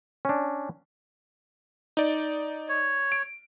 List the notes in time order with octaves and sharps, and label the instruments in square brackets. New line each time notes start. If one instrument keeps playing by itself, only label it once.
[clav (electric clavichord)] C#4 D4
[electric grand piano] D#4 D5
[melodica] C#5
[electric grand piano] D7